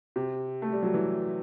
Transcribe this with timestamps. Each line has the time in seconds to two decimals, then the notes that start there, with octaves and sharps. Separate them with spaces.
0.16 C3
0.62 A3
0.72 G3
0.83 F#3
0.94 E3